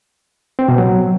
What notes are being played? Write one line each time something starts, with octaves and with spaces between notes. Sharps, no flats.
C4
B2
F#3